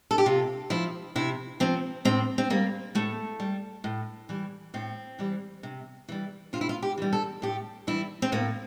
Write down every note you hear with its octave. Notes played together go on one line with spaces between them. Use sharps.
A4
G4
C3 F4
F3 E4
C3 E4
F3 C4
A2 C4
C4
G3 A#3
A2 A3
G3
A2
E3 G3
A2 C4
E3 G3
C3
E3 G3
C3 F4
E4
F4
G4
E3 G3
A4
A2 G4
E3 G3 E4
C4
A2 A#3